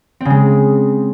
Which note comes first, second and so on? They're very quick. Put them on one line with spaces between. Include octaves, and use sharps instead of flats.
C4 C#3 G#3